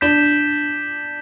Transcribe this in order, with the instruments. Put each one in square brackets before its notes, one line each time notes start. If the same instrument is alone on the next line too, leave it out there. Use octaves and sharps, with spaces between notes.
[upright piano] D4 [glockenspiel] G6 B6 E7 G7